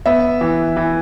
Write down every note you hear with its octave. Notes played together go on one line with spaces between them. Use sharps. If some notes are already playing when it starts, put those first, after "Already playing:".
B3 E5
E3
E3